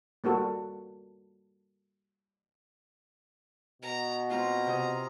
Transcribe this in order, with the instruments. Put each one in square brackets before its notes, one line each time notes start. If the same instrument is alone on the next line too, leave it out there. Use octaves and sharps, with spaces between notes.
[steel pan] G3 A#3 F#4 A4
[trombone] B2 [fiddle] A#5
[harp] C4 F4 [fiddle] A#5
[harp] C3 D#5